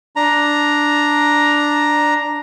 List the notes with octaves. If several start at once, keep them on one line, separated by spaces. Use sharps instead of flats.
D4 A#5